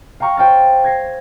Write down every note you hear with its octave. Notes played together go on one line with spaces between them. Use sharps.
F5 G5 A#5 C#6 F6
C5 G5 F6 A6
G#6 A#6 C7